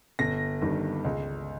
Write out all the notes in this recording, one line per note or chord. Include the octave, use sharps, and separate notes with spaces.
G1 A#6
G2 D#3
C#2